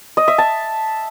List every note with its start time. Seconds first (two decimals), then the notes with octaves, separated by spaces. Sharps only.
0.17 D#5
0.28 E5
0.38 A5